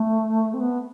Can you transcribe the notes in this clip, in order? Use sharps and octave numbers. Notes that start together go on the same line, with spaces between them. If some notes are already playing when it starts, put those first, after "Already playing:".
Already playing: A3
C4
B3